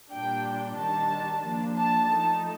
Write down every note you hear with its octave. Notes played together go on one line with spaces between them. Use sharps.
A#2 G3 D4 G5
D#3 G3 D4 A5
F3 A#3 D4
A5
F3 A3 D#4